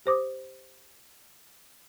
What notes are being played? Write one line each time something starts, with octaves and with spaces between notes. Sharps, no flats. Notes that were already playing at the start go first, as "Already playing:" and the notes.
G4 C5 D6 D#6